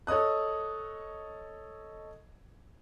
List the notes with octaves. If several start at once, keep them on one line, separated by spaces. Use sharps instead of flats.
A4 C#5 D#5 D#6 F#6